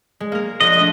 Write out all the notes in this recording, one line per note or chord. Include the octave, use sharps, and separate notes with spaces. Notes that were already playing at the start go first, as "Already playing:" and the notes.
G#3
A#3 A#4
A#1 D#5 F#6
A3 D4